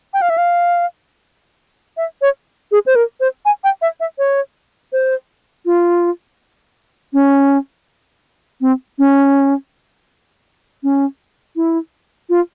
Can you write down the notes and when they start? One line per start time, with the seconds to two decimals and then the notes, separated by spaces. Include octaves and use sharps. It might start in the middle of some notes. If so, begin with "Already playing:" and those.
0.13 G5
0.22 F5
0.30 E5
0.38 F5
1.97 E5
2.21 C#5
2.71 G#4
2.86 C5
2.95 A#4
3.20 C5
3.45 G#5
3.64 G5
3.82 E5
4.00 E5
4.18 C#5
4.92 C5
5.66 F4
7.13 C#4
8.61 C4
8.98 C#4
10.83 C#4
11.56 E4
12.29 F4